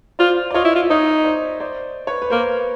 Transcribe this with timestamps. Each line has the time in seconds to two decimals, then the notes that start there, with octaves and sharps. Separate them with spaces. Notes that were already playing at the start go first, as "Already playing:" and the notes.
0.19 F4 C5 D5
0.51 D5
0.54 F4 C#5 D#5
0.64 E4
0.75 F4
0.83 E5
0.90 D#4 C#5 D#5
1.24 C5 D5
1.60 C5 D5
2.07 B4 C#5
2.22 B4
2.30 A#3 A#4 C5